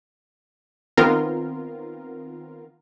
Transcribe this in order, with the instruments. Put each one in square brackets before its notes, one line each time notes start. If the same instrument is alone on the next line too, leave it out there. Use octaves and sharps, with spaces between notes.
[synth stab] D#3 B3 C4 F4 A#4